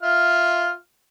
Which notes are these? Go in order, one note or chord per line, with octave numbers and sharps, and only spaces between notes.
F4 E5 F6